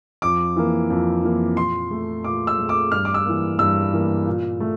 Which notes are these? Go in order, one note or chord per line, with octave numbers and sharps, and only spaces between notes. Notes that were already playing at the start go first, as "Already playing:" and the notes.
F2 D6
E3 A#3
F2
E3 A#3
A#2 C6
A3
A#2 D6
E6
A3
D6
G2 F6
D6
E6
E3 A#3
G2 E6
E3 A#3
A#2
A3